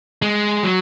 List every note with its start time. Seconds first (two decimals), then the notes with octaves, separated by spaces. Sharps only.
0.22 G#3
0.64 F#3